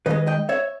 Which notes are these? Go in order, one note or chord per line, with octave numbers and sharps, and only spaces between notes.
D#3 G#3 B4 D#5
D#5 G5
C#5 E5